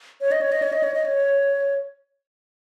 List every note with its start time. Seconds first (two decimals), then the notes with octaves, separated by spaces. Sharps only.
0.21 C#5
0.32 D#5
0.41 C#5
0.52 D#5
0.62 C#5
0.73 D#5
0.83 C#5
0.94 D#5
1.05 C#5